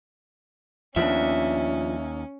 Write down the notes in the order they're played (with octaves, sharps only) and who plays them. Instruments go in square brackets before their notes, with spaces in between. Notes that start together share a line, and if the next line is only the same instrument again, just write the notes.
[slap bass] D#2 [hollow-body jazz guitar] F3 B3 D4 [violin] C#4 [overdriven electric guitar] E5